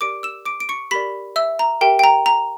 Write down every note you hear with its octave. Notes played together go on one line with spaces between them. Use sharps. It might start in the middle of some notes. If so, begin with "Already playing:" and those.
G4 A#4 D5 D6 D7
E6 E7
D6 D7
D7
C#6 C#7
G4 A#4 D5 B5 B6
E5 E6
A#5
G4 A#4 E5 G5
G5
A#5
A#5